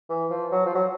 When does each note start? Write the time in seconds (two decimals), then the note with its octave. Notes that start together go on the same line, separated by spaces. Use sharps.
0.10 E3
0.30 F3
0.52 F#3
0.66 F3
0.75 F#3